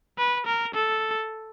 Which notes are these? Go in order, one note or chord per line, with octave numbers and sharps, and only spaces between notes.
B4
A#4
A4